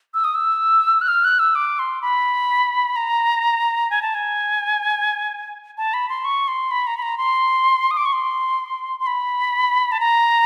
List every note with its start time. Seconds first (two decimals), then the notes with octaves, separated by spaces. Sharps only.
0.14 E6
0.24 D#6
0.35 E6
1.01 F#6
1.08 F6
1.24 F#6
1.39 E6
1.55 D6
1.79 C6
2.02 B5
2.96 A#5
3.90 G#5
4.02 A5
4.15 G#5
5.78 A5
5.94 B5
6.09 C6
6.25 C#6
6.48 C6
6.71 B5
6.87 A#5
6.97 B5
7.02 A#5
7.18 C6
7.91 D#6
7.97 D6
8.06 C#6
8.13 C6
9.00 C6
9.07 B5
9.92 A5
10.00 A#5